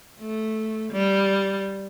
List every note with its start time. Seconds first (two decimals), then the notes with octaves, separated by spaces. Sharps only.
0.20 A3
0.92 G3